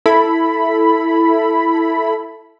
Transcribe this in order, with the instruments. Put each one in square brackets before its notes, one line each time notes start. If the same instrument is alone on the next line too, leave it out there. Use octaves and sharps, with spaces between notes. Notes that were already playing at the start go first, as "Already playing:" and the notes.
[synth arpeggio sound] E4 A4 B5